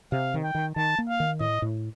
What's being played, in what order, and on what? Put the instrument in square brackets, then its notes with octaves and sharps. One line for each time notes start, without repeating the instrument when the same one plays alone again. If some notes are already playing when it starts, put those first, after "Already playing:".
[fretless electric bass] C3 [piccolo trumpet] F5
[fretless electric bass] D#3
[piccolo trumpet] G5
[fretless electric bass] D#3
[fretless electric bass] D#3 [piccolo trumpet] A5
[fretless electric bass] A#3
[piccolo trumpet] F5
[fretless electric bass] D#3
[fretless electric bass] A2 [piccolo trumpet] D#5
[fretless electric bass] A2